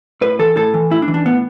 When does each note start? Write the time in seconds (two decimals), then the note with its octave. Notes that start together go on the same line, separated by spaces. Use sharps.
0.21 A2 B4
0.39 E3 A4
0.56 A2 A4
0.74 E3
0.91 A2 E4
1.02 D4
1.08 E3
1.14 D4
1.26 A2 B3